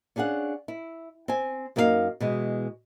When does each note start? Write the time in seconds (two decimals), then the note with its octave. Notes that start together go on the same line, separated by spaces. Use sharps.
0.16 C#4 D4 G#4 F5 F#5
0.68 E4
1.28 C4 G#5
1.76 F#2 A#3 D#4 G4 F5
2.20 B2 E3 G#3